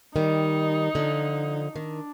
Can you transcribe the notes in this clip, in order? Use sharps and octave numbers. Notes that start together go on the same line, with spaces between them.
D#3 G3 D#4
D3 F3
D#3 D4